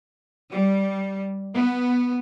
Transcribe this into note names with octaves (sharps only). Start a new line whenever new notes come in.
G3
B3